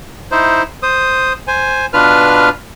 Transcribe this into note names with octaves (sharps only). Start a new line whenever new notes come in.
D#4 E4 C5
C5 D#6
C5 G#5
B2 D4 F4 B4 F6